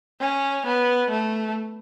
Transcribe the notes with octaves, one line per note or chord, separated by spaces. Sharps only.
C#4
B3
A3